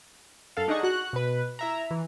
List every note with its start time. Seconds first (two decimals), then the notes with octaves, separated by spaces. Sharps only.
0.57 F#2 A4 F5
0.68 D4 D#4 G#4 D#5 F#5 C#6
0.83 F#4 F#6
1.13 B2 B4
1.59 E4 E5 A#5
1.91 E3